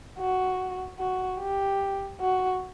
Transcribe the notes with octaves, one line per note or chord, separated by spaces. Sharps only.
F#4
F#4
G4
F#4